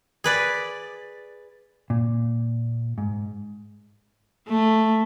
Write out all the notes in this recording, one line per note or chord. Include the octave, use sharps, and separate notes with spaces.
G#4 B4 D5
A#2
G#2
A3